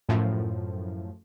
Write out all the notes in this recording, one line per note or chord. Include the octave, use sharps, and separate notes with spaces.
F#2 A2 F3